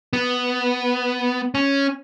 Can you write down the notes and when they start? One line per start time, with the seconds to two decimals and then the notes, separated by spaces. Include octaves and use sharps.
0.13 B3
1.55 C#4